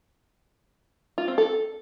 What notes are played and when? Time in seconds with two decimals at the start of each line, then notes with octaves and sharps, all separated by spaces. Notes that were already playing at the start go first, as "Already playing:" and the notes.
1.18 F4
1.28 C4
1.38 A4